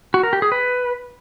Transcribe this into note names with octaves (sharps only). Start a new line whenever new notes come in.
F#4
A#4
G4
G#4
B4